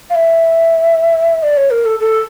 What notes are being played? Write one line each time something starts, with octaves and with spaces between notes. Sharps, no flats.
F5
E5
D5
C#5
A#4
A4
A4